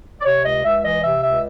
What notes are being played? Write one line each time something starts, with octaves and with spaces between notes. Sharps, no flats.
D5
C3 C#5
C#2 D#5
C#2 E5
E3 D#5
C3 E5
C#2 E5